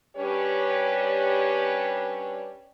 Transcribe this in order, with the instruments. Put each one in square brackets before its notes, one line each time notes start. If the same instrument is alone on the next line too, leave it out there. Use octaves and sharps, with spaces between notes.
[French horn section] G3 C#4 D4 G4 B4 C#5